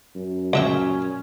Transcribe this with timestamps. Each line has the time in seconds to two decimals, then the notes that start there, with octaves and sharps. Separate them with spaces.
0.16 F#2
0.53 C#2 A#2 C#4 E5 G5